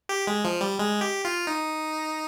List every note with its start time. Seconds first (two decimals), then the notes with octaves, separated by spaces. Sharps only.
0.09 G4
0.27 G#3
0.45 F3
0.61 G3
0.79 G#3
1.01 G4
1.25 F4
1.47 D#4